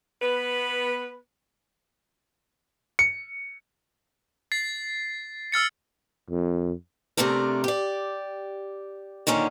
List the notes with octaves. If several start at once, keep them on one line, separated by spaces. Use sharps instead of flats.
B3 B4
C#7
A6 C7
E6 F6 A6 C#7
F2
C3 A3 C4 D4 A#4
G4 D5
A#2 D3 D#3 C#4 D#4